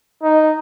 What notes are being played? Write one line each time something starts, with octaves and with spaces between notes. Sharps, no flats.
D#4